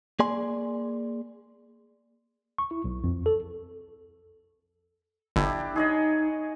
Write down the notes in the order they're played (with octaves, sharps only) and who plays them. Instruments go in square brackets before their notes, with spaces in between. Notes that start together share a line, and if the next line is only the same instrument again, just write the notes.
[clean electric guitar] A#3 G#4 D5 G#5 C6
[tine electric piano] C#6
E4
B1
F2
A4
[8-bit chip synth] G1 [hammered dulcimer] D4 E4 G4
[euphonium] D#4 [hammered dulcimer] G#4 C#5 D#5